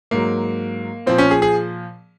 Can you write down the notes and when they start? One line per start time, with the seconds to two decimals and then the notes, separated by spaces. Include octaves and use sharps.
0.11 G#2 F#3 A#3
1.06 A#2 F3 C4
1.18 C#4
1.31 G#4
1.42 G#4